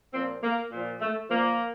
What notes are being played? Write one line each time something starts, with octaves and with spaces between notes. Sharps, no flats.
A#2 F3 C4
A#3
A#2 F3
A3
A#2 F3 A#3